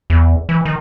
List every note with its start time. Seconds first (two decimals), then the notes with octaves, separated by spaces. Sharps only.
0.10 E2
0.49 E3
0.65 D#3